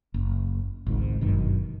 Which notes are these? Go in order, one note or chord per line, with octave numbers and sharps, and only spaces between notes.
F#1
G#1 C#2 G#2
G1 F#2 B2 D#3